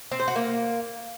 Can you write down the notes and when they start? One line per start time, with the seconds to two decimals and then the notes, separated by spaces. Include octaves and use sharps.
0.12 C4
0.20 C5
0.28 F#4
0.36 A#3